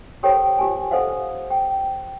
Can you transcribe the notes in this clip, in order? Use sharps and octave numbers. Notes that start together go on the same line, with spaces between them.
G4 A4 A#4 C5 C#5 G5
F4 G4 G#5
A4 C5 D#5 F5 F#5
G5